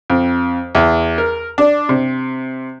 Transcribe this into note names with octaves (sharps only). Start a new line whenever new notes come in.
F2
E2
A#4
D4
C3